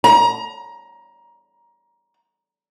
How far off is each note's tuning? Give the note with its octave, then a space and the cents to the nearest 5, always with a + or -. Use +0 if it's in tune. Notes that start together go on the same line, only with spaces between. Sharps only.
A#5 +20